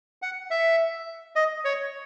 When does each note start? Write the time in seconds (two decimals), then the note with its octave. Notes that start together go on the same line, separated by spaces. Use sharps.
0.22 F#5
0.51 E5
1.36 D#5
1.65 C#5